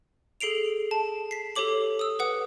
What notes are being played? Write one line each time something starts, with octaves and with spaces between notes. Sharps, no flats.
G#4 A4 C7 D7 F7
A5
B6 C7
G4 A4 C#5 D6 F#7
D#6 E6
B4 F#5 D#6